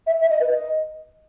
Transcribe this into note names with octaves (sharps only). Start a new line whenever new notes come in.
E5
E5
D#5
B4
D#5